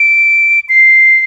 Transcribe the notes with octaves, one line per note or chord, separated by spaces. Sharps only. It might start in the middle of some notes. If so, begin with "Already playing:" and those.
Already playing: D7
C7